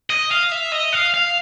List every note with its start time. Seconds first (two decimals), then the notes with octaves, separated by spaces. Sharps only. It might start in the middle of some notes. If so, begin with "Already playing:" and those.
0.10 D#5
0.31 F5
0.52 E5
0.72 D#5
0.93 F5
1.14 F5